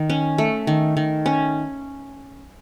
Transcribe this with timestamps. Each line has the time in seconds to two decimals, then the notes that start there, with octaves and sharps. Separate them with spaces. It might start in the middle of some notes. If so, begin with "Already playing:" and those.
Already playing: D#3
0.10 C#4
0.38 A3
0.67 D#3
0.97 D#3
1.26 C#4